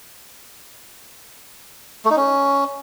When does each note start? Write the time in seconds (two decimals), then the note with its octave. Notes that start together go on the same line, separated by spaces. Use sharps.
2.05 A3
2.11 D#4
2.16 C#4